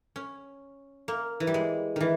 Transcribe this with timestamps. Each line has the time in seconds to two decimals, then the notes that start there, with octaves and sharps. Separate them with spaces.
0.16 C#4
1.08 A#3
1.40 E3
1.47 G3
1.54 G#3
1.96 D#3 E3